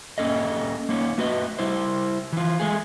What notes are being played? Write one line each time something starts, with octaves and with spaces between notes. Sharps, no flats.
A#3 C#4 A4 D#5
A#3 C#4 D#4
A3 F#4 B4 D#5
G3 E4 C5
E3 F4
G#3 A3 G#4